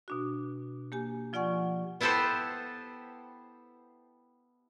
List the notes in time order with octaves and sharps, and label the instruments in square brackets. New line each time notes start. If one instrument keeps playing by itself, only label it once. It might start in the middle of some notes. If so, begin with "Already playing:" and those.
[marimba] B2 D4 F#4
A#3 G4 G#5
F3 F4 D5 F#5 G#5 C#6
[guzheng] B3 E4 G4 A4 B4 C5